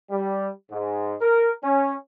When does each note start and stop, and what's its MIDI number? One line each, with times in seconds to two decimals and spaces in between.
0.11 0.49 55
0.71 1.15 44
1.21 1.51 70
1.64 1.95 61